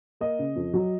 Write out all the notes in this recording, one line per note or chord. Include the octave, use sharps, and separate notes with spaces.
A#3 D#5
C#3
F2
F#3